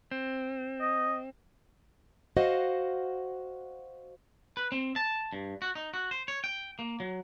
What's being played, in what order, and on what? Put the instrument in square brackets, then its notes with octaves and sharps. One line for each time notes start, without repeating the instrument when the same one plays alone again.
[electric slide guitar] C4
[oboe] D#5
[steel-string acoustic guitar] F#4 C5 D#5 F5 F#5
[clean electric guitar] B4
C4
A5
G2
F#4
D#4
F#4
C5
C#5
G5
A#3
F#3